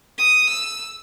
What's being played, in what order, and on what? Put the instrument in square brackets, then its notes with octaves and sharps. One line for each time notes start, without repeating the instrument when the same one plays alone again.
[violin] D#6
E6